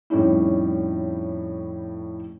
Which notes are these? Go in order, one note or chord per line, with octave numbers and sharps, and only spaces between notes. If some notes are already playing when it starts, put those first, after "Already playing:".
F2 A2 G3 C#4 D#4 E4